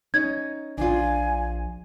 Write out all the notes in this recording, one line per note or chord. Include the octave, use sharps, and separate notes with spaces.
C#4 D#4 G#6
A#1 D4 F4 G#5